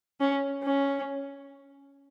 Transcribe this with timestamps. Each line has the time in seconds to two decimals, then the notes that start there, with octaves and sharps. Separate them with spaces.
0.20 C#4
0.63 C#4